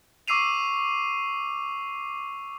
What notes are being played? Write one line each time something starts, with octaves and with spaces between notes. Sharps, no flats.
C#6 D6 E6 C7 D#7 F7